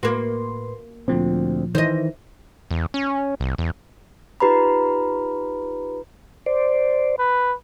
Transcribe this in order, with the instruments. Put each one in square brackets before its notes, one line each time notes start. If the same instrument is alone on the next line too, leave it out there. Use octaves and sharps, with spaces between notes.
[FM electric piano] A2 B4 C6 [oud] A#3 F#4
[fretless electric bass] D2 C4 [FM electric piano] A#2 F3
[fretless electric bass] D#3 E3 [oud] C5 D#5
[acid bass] E2
C#4
C2
E2
[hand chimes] D#4 F4 G4 B4 A#5 B5
[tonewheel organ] C5 D5
[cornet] B4